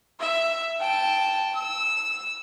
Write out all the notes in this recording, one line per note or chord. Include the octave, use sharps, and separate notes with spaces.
E5
G5 A5
E6